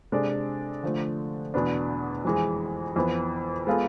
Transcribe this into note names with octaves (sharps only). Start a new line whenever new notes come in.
C3 G#3 D4 A4 D5
D3 F3 A3
E2 B2 B3 D4
F2 E3 G#3
F2 E3 B3
G#3 B3 F4 A4